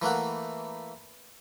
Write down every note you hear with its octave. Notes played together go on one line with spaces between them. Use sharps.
E3 A3 A#3 F#5